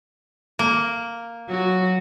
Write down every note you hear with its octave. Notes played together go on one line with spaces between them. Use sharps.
A#3
F#3 F#4